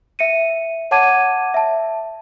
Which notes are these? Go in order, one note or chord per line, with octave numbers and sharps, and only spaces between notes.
E5 C#7 D#7
C#5 F#5 A5 D6 G#6 D#7
E5 A5